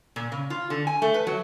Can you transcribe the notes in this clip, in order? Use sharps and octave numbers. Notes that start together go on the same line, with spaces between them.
A#2
C#3
F4
D3
G#5
A3
B4
F#3